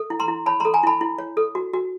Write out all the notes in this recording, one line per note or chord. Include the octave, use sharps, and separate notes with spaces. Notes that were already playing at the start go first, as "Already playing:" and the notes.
Already playing: A4
E4
A#5 C6
E4
C#5 A5 B5
A4 A#5 C6
G#5 A#5
E4 A5 B5
E4
C#5
A4
F#4
F#4